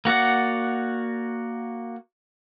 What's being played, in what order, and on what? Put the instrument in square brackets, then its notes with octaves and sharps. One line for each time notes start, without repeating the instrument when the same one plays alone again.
[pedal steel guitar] A#3 F#4 D5 F#5